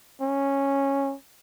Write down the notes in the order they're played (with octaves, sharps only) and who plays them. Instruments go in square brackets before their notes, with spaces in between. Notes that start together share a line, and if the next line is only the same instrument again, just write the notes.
[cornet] C#4